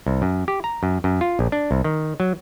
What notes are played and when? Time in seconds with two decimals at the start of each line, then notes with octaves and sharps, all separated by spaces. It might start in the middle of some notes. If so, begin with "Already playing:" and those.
0.07 C2
0.22 F#2
0.48 G4
0.64 A#5
0.83 F#2
1.04 F#2
1.21 F4
1.39 A#1
1.52 D4
1.71 C2
1.84 D#3
2.20 F#3